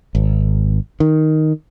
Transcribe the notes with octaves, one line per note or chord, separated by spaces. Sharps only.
G#1
D#3